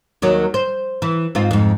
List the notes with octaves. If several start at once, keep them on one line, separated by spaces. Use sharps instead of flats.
D#2 D#3 F#3
C5
E3
G#2 C4 F4
F2 G#2